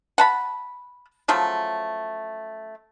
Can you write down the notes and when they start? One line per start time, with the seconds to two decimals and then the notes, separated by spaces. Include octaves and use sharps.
0.18 F#5 A5 B5
1.28 C#3 F3 F#3 A3